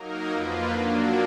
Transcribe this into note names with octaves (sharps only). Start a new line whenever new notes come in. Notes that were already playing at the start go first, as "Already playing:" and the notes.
Already playing: F#3 A#3 D#4 A#4
F2 F3 A#3 F4 B4
F#3 A#3 D4